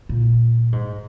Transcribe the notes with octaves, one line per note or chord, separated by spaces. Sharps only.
A#2
G#2